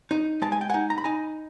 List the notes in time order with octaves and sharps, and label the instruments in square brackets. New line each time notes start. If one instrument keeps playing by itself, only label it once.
[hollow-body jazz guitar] D#4
G#3 A5
G#5
G5
D#4 F#5 G#5
A#5
B5
D#4 G#5 A#5